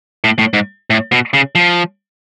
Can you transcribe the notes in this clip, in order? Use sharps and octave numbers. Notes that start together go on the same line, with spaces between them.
A2
A2
G#2
A2
B2
C#3
F3